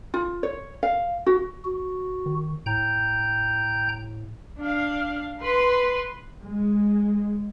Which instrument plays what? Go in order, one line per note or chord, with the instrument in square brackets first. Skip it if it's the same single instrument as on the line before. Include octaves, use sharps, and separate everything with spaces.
[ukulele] F4
C#5
F5
F#4
[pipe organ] F#4
[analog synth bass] D#3
[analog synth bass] A2 [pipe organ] G5 A#5 G6
[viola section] D4 F5
B4 C6
[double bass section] G#3